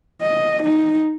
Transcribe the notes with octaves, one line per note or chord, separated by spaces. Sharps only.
D#5
D#4